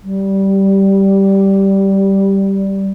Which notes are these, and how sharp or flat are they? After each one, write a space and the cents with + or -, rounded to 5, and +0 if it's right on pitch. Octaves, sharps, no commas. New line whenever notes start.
G3 -10